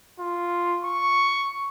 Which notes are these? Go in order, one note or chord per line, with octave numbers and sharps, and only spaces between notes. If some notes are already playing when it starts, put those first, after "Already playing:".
F4
C#6